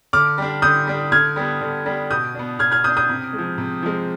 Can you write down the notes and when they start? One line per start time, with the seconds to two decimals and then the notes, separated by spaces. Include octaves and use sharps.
0.13 D3 D6 F6
0.38 G3 D4
0.62 D3 D#6 G6
0.87 G3 D4
1.12 D3 F6 G#6
1.36 G3 B3 D4
1.61 D3
1.86 G3 B3 D4
2.10 B2 D#6 G6
2.35 B3 D4
2.59 B2 F6 G#6
2.71 F6 G#6
2.84 B3 D#6 G6
2.88 D4
2.97 D#6 G6
3.09 C3
3.33 G#3
3.38 F3
3.58 C3
3.83 F3 G#3